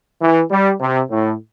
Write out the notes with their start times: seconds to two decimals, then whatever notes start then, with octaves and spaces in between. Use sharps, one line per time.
0.21 E3
0.51 G3
0.81 C3
1.11 A2